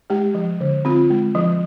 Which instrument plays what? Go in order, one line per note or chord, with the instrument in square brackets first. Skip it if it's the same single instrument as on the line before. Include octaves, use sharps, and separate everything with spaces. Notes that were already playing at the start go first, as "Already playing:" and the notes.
[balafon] G#3 G4
F3
D3
C4 F4
G#3
F3